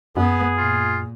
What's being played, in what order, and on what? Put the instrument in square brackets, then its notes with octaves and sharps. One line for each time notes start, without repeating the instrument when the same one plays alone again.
[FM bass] F#2 [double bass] B3 [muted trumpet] G#4
[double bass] A#2 [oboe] F4